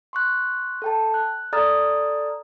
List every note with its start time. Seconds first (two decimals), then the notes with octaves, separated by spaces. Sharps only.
0.13 C6 C#6 F#6
0.82 A4 G5 A5
1.14 F#6
1.53 A4 D5 A#5 D#6 F6 A6